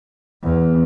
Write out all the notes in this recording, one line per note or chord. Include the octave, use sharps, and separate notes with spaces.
E2